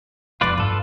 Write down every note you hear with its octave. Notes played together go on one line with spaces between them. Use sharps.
D#1 F2 F4 B4 D5
G2 F4 A4 B4